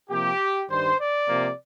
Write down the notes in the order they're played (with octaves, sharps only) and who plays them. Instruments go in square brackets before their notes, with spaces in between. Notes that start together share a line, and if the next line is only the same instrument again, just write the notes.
[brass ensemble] C3 F3 A#3 G4
G2 D#3 G3 C5
D5
C3 F3 A#3